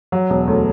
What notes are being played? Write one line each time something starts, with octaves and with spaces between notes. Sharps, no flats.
F#3
E1
D2